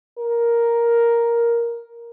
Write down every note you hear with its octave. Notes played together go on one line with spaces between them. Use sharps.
A#4